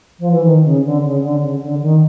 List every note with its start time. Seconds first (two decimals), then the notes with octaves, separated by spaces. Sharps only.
0.19 F3
0.31 E3
0.44 D#3
0.64 C#3
0.84 D3
1.03 C#3
1.22 D3
1.41 C#3
1.61 D3
1.80 D#3